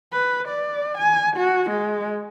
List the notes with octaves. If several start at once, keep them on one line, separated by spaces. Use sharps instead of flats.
B4
D5
G#5
F#4
G#3